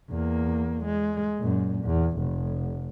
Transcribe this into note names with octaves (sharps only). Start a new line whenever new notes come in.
E2 A#3
G#3
F#2 A#2
E2
F1